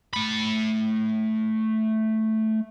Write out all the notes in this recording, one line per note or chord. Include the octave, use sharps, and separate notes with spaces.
A3 B5